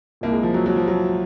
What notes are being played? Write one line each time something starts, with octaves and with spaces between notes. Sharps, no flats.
C2 A#2 A#3
G#3
F3
F#3
F#3
F3
F#3